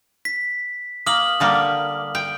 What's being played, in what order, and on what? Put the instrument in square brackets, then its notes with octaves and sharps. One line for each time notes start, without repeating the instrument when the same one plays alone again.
[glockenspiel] B6
[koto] A#3 [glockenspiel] D#6 F6 F#7
[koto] D3 G3 A#3
G5